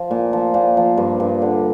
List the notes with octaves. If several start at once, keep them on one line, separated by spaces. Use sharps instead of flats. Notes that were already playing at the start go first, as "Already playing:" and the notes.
Already playing: F3
A#2
F3
A#2
F3
G2
G2
D3